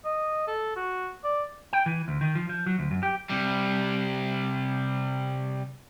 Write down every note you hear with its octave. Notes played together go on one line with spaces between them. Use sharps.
D#5
A4
F#4
D5
G5
E3
D2
D#3
F3
F3
F#3
D2
F#2
G4
C3 G3